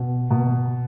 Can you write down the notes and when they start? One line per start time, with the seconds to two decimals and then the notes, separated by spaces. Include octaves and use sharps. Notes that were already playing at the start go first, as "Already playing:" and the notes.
Already playing: B2
0.31 B2